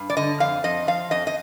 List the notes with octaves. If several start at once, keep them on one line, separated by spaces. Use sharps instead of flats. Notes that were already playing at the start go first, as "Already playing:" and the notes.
Already playing: G2
D5
D3 D#5
F2 F5
F2 D#5
F3 F5
F2 D#5
D#5